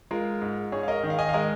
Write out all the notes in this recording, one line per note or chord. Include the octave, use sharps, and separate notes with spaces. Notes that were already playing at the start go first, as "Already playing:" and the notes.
G#3 F4 A#4
G#2
G#2 G#4 C#5
F5
A#4 D#5
D#3
F5
D#5 G#5
F5
G#3 A#4 D#5